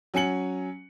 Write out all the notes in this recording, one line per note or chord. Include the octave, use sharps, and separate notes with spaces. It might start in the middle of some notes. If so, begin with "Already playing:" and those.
F#3 C#4 G#5 C#7 F#7